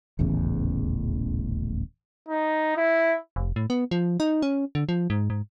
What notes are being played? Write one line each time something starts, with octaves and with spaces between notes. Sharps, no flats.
D#1 A1 E2 C#3
D#4
E4
F1
A2
B3
F3
D#4
C#4
D3
F3
G#2
G#2